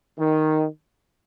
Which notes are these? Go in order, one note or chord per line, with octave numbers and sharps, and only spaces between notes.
D#3